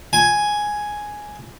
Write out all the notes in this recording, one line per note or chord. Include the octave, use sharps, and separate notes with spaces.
G#5